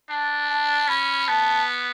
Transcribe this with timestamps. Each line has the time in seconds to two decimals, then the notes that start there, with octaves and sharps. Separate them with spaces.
0.10 D4 A5
0.50 A5
0.88 C#4 B5
1.28 B3 A5